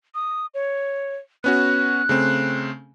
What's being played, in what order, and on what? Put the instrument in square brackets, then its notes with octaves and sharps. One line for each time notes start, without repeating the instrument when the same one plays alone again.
[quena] D#6
C#5
[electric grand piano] B3 C#4 F#4 [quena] F#6
[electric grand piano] C#3 A3 C4